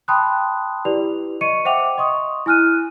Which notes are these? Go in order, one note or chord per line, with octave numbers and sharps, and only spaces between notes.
G5 A5 B5 C6 D#6 F#6
E4 G4 B4 D5 F7
D#5 C#6 C#7 D#7
C5 E5 F#5 G5 D6 F7
D#5 C6 C#6 D#6
E4 G#5 F6 F#6 D#7